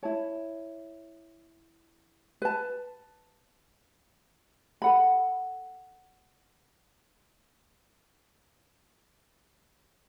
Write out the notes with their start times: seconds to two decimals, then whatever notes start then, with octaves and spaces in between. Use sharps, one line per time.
0.03 E4 C#5 A5
2.42 B4 A5
4.82 A4 F#5 B5